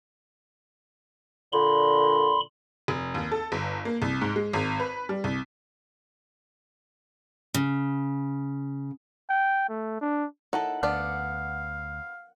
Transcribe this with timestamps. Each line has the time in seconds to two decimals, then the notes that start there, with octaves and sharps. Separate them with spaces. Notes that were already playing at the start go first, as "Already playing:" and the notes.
1.53 A#2 D3 B5 C6
2.88 F1
3.15 D#2
3.32 A4
3.52 G1
3.85 A#3
4.02 C2
4.21 G#2
4.36 G#3
4.53 G#1
4.80 B4
5.09 G3
5.24 C2
7.54 C#3
9.30 G5
9.69 A3
10.01 D4
10.53 D#4 E4 A4 F#5
10.83 D2 B3 D4 D5 F5